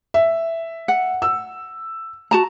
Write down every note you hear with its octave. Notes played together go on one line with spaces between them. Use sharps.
E5
F#5
E6
F#4 A5 A#5